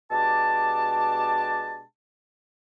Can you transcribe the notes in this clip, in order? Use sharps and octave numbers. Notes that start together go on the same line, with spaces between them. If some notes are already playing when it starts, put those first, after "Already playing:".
B2 G#3 D4 G4 A5